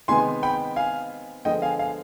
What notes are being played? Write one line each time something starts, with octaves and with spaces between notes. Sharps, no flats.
C3 D#3 G#3 B3 G#5 C6
G5 B5
F5 G#5
D3 F3 G#3 B3 D#5 G5
F5 G#5
F5 G#5